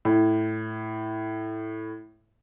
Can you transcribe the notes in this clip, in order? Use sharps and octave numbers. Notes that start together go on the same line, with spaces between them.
A2